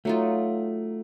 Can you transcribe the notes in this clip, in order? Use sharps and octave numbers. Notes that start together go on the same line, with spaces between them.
F#3 A3 D#4 F4